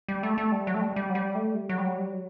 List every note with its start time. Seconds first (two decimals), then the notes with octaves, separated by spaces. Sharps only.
0.08 G3
0.23 A3
0.38 A3
0.52 G3
0.67 F#3
0.74 A3
0.81 G3
0.96 G3
1.09 F#3
1.15 G3
1.35 A3
1.55 G3
1.69 F#3
1.78 G3
1.84 F#3
1.98 G3
2.14 F#3